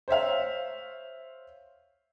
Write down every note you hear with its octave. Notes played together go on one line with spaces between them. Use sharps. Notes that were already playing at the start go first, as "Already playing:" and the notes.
C5 C#5 E5 F5